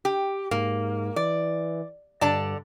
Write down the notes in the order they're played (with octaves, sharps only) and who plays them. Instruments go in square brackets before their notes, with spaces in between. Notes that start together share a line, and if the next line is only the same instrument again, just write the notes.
[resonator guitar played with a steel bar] G4
[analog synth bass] G#2 [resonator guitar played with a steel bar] A#3
[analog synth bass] E3 [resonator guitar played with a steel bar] D5
[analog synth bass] G2 [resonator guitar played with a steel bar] D3 D5 A5